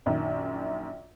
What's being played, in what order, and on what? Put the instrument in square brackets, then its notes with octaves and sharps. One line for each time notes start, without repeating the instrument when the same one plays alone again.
[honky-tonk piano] A#1 F#2 D#3